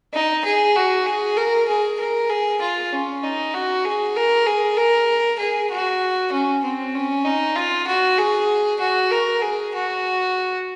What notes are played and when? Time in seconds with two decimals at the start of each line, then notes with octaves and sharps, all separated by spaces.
0.13 D#4
0.45 G#4
0.76 F#4
1.06 G#4
1.37 A#4
1.68 G#4
1.99 A#4
2.30 G#4
2.61 F4
2.92 C#4
3.23 D#4
3.54 F#4
3.85 G#4
4.16 A#4
4.46 G#4
4.77 A#4
5.39 G#4
5.71 F#4
6.32 C#4
6.64 C4
6.95 C#4
7.25 D#4
7.56 F4
7.87 F#4
8.18 G#4
8.80 F#4
9.11 A#4
9.42 G#4
9.74 F#4